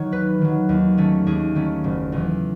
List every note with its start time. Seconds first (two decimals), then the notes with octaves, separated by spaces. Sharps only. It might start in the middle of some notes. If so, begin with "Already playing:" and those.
Already playing: D#3 F#3 C#5
0.12 D#2 B4
0.41 D#3 F#3
0.69 D#2
0.98 D#3 A3 C#4
1.26 D#2 G#4
1.55 D#3 A3 C#4
1.84 F#1
2.12 E2 C#3 E3